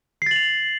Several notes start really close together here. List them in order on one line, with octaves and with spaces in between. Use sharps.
C7 A6 F#7 F7